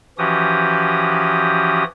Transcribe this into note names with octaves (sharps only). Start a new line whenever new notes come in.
E3 F3 C#4 F#4 G4 D#6